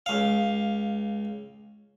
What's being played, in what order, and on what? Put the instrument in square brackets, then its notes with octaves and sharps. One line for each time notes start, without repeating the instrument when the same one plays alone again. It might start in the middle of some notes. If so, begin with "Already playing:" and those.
[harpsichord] C#2 F5